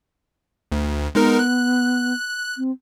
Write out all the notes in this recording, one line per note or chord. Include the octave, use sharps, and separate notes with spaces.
D2
G#3 B3 D#4 A#4
F#6
C4